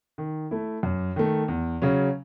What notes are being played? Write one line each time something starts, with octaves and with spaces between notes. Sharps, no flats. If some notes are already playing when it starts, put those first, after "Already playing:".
D#3
A3 E4
F#2
D#3 A3
E2
C#3 F#3 C#4